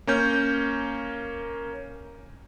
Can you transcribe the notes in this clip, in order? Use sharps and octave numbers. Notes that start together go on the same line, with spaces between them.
A#3 C#4 G6